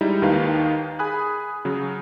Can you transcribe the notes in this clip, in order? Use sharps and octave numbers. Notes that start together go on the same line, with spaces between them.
G3 G#3 D#4 E4
D#2 D#3 D#4 B4 F5
G#4 G#5 B5 D#6 F#6
C#3 F#3